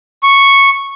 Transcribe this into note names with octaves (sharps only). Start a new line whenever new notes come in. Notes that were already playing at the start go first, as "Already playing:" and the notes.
C#6